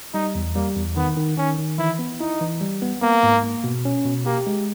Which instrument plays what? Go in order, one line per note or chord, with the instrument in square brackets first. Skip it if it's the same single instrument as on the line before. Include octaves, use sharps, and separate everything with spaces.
[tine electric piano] G3 [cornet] D#4
[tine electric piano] E2
[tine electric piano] G3 [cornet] A#3
[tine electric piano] E2
[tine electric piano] D#3 [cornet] B3
[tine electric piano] D#3
[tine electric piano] D#3 [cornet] C#4
[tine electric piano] D#3
[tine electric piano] E3 [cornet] E4
[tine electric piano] B3
[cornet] D#4 [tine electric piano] E4
[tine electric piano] E3
G3
B3
[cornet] A#3 [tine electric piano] B3
[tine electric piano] G#2
A#3
B2
C#4
B2
[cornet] A#3 [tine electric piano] G4
[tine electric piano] G#3